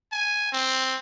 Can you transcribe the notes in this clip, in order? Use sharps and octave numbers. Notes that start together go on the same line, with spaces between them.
G#5
C4